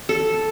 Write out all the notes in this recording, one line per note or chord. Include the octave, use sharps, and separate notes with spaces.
A4